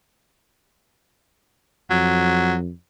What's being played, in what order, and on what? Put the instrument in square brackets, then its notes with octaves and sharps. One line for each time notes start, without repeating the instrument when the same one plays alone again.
[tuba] F2 [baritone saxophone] F#3